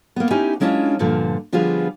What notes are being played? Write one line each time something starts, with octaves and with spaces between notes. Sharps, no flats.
A#3 B3
C#4 D#4 E4 G4 G#5
F#3 G#3 C#4 D4 E4 F4
G2 A#2 D3 F3
D3 F3 G3 B3 F4 G#4